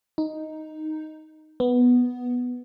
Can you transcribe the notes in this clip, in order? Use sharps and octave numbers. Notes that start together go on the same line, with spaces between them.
D#4
B3